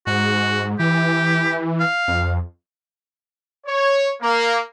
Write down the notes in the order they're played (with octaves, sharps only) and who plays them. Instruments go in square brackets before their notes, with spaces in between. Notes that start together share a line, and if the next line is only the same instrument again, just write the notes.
[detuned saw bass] G#2 [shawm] F#4
[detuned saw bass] E3 [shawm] G4
[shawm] F5
[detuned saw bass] F2
[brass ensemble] C#5
A#3